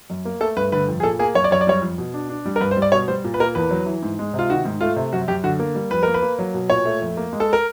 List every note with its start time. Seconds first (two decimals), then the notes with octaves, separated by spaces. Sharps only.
0.10 F#2
0.25 A#3
0.41 A3 A4
0.57 G2 B4
0.72 D3 B4
0.88 F2
1.00 G#4
1.03 A#2 A4
1.19 A#3 G#4
1.35 F#2 C#5
1.44 D5
1.51 F#2 C#5
1.61 D5
1.67 G3 C#5
1.82 F2
1.98 B2
2.14 D4
2.30 D4
2.46 G3
2.56 A#4
2.61 G2 B4
2.71 C5
2.77 G3
2.82 D5
2.92 B2 C#5
3.08 G3 C5
3.24 A#2
3.34 B4
3.40 A#3 A#4
3.55 E2 B4
3.71 F#3
3.86 E3
4.02 G#2
4.19 G#3
4.33 C3
4.39 F4
4.50 D#3 F#4
4.65 G#2
4.81 A3 F4
4.96 C3
5.13 F#2 F#4
5.28 F#2 G4
5.44 D3 F#4
5.59 A#3
5.75 G3
5.91 F2 B4
6.03 A#3 A#4
6.14 B4
6.22 A#3
6.39 F#3
6.54 B2
6.70 A#2 C#5
6.85 A3
7.01 F2
7.17 A#3
7.33 G#3
7.40 A4
7.53 A#4